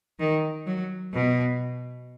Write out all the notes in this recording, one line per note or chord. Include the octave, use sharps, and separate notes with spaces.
D#3
F#3
B2